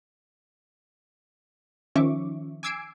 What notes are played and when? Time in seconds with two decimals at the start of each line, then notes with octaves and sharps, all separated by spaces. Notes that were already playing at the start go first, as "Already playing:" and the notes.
1.95 D#3 F3 C#4 E5 C#6 D6
2.63 G#5 D6 E6 G#6 C7 D7